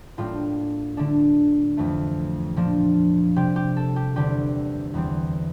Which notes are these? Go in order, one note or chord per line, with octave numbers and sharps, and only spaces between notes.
A2 G3 A#3 D4 F4
D3 A3 D4
F2 E3 A3
A#2 F3 A#3 D4
C3 G3 C4 G4
G4
A4
G4
E2 D3 G3 C4 G4
E2 E3 G3 C4